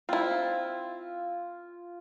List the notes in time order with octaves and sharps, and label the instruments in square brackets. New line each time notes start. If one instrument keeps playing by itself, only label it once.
[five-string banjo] C4 E4 [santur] F4